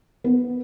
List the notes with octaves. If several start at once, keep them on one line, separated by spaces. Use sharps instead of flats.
B3